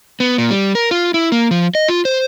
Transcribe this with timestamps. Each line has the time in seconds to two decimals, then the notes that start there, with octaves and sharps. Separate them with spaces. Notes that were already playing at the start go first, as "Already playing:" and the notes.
0.20 B3
0.38 A#2
0.51 G3
0.75 A#4
0.91 F4
1.14 E4
1.32 A#3
1.51 F3
1.75 D#5
1.88 F4
2.05 C5